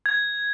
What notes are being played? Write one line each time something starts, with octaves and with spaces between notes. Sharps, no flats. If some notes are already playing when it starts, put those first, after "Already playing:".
G#6